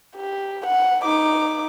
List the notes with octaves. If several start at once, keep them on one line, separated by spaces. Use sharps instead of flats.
G4
F#5
D#4 D6